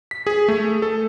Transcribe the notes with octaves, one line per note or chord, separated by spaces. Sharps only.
B6
G#4
A3
A4